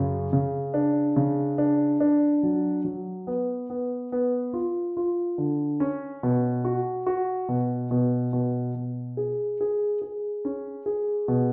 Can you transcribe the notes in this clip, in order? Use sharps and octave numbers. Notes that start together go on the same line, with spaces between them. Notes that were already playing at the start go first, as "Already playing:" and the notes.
Already playing: F#2 C#3
C#3
D4
C#3
D4
D4
F#3
F#3
B3
B3
B3
F4
F4
D3
C#4
B2
F#4
F#4
B2
B2
B2
B2
G#4
G#4
G#4
C#4
G#4
B2